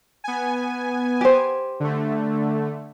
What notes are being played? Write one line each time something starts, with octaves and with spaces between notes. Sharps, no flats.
B3 G#5
G4 C5
D3 A3